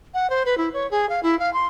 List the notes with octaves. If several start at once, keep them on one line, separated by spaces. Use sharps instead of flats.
F#5
C5
B4
E4
C#5
G#4
F5
E4
F5
C6